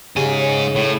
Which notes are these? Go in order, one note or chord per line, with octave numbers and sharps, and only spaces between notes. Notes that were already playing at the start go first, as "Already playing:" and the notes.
G#2 C#3 G4 G#5
C#5
A2